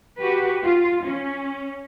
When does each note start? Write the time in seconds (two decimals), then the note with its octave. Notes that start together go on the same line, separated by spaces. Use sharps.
0.18 F#4 G4 B4
0.63 F4
1.04 C#4